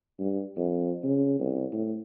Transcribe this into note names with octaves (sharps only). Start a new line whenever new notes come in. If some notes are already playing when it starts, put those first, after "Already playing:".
G2
F2
C#3
C2
A2